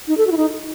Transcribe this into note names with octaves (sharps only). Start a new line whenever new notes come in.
D#4
A4
F#4
E4
D#4